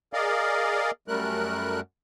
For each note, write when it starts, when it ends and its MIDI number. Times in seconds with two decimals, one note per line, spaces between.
0.13 0.91 68
0.13 0.91 70
0.13 0.91 74
0.13 0.91 75
0.13 0.91 77
1.08 1.80 42
1.08 1.80 55
1.08 1.80 57
1.08 1.80 70
1.08 1.80 90